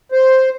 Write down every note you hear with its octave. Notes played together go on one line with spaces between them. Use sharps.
C5